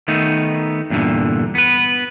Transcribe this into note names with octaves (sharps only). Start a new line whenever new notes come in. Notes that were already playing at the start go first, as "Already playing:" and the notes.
D#3 A3 B3 D#4
E2 G2 A#2 D3
B3 B4